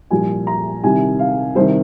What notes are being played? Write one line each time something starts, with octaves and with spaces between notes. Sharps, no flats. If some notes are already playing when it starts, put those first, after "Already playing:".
C2 A#2 F3 G#5
A#5
C2 C3 D#3 G#5
F5
C2 C3 D#3 C5